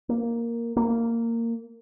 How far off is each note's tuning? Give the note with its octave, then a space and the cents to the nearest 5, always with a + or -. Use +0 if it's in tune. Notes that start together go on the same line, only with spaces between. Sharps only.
A#3 +0
A#3 -15